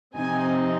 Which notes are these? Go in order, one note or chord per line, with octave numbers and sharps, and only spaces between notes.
C3 F3 C4 D#4 G#5